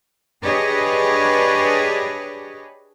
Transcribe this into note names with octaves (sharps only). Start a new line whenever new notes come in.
D4 G4 G#4 B4 C#5 D#5